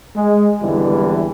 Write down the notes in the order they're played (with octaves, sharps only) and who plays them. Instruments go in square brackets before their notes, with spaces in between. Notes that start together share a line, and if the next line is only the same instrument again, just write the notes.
[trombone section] G#3
G#1 E2 D3 E3 G3